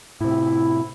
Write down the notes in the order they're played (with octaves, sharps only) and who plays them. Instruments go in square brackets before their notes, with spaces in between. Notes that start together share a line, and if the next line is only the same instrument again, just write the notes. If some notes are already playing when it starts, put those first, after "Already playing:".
[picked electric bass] A2 C3 [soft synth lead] E4